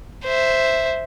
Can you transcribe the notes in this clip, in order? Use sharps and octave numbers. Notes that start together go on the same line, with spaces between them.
C5 E5